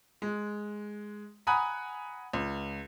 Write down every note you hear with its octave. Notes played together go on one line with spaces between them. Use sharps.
G#3
F#5 G#5 A#5 B5 D#6 F#6
C#2